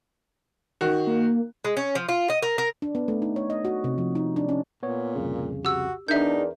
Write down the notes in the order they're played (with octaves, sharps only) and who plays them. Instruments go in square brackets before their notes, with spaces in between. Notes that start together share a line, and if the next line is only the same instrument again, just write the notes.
[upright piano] D#3 F#4
[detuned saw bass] A#3
[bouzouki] G#3
C#4
F3
F4
D#5
A#4
A#4
[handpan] D4
B3
A3
D#4
C#5
D#5
F#4
C3
F3
D#4
D4
C#4
[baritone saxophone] A#2 [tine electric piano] B3 C#5
[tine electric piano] C2 F2 C#3
[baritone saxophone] F#4 [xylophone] G4 E6
[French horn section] E2 D4 [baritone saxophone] D#4 [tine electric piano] A#4 [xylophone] E5 G6